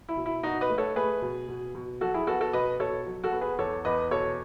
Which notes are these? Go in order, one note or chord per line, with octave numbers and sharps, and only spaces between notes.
E4
B2
E4
B2 D#4 F#4
B4 D#5
A3
A4 C#5
A3 G#4 B4
B2
B2
B2
F#3 F#4 A4
E4 G#4
B3 F#4 A4
F#4 A4
B2 B4 D#5
B2 A4 C#5
F#3
F#4 A4
B3
G#4 B4
E2 A4 C#5
E2 B4 D#5
B2 A4 C#5